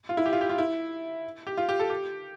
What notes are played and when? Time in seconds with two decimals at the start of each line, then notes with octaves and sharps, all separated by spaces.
0.09 F4
0.17 E4
0.26 G4
0.33 F4
0.41 G4
0.49 F4
0.58 E4
1.47 G4
1.57 F4
1.69 G4
1.79 A4
1.90 G4